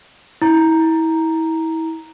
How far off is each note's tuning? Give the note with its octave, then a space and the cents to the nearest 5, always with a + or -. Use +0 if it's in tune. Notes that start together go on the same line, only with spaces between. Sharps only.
E4 -30 A#5 +0